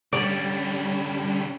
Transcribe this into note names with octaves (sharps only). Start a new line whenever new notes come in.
D3 G3 C#4 D5